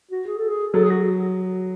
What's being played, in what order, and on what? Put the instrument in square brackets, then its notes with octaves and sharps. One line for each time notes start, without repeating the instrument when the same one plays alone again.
[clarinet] F#4
G#4
A4
G#4
[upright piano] F#3 [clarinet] A4
[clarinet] G#4
F#4